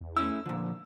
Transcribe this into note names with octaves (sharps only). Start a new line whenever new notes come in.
E2
A3 C#4 E4 E6
A#2 D3 F3